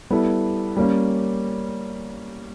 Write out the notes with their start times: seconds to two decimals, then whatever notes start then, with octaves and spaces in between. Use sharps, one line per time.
0.10 G3 B3 E4 A4
0.77 G3 A#3 C#4